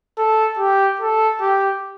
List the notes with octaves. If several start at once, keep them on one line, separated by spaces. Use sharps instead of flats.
A4
G4
A4
G4